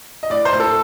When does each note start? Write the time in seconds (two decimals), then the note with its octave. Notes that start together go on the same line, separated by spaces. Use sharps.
0.23 D#5
0.30 A2 D5
0.45 C5
0.53 A2
0.60 A4